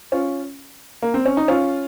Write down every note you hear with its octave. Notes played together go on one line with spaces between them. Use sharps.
C#4 F4
A#3
C4
C#4
D#4
C#4 F4